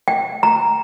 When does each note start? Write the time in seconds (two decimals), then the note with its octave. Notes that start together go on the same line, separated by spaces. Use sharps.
0.08 G5
0.43 A#5